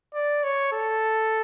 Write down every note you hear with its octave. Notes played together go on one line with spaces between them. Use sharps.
D5
C#5
A4